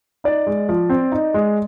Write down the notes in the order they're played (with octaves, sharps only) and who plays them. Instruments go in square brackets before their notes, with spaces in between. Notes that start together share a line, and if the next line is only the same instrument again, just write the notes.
[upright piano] D#4 D5
G#3
F3
C4
D#4
G#3